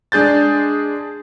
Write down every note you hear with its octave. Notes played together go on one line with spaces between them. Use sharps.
G#3 D4 G#4 G6 A6